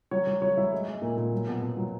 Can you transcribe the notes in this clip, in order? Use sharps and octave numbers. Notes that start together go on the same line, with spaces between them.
F#3 C#5
F#3
F#3 C#5
F#3 E4
G#3
G#3
A#2
A#2
F#3
B2
B2
F#3